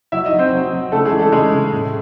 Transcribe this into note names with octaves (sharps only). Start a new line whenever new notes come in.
F#3 E4 E5
D#4 D#5
F#3
C4 C5
F#3
F#3
C#3 A3 A4
G#3 G#4
E3
A3 A4
C#3 G#3 G#4
C#3
A2